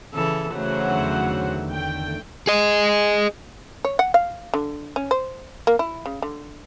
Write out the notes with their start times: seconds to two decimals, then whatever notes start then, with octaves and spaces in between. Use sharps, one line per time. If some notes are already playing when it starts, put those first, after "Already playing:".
0.14 C#3 E3 A4
0.52 C#3 E3 F#3 A3 C5 F#5
0.85 E2 D3 D#3
1.71 A3 G5
2.47 G#4 D#5
3.84 C#5
3.99 F#5
4.14 F5
4.54 D3
4.96 C#4
5.11 C5
5.67 A#3
5.79 E4
6.06 C#3
6.22 D3